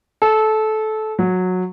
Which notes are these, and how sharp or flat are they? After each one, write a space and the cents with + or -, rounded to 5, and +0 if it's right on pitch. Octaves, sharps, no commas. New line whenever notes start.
A4 -20
F#3 -15